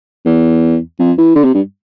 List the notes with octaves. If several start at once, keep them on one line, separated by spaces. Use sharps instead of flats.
E2
F2
E3
D3
C3
G2